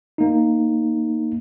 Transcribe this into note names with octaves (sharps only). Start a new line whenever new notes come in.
A#3 D#4